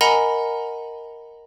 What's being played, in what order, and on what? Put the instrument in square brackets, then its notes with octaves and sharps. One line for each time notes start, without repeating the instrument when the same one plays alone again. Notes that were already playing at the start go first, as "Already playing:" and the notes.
[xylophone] A#4 D#5 F#5 G#5 A#5 B5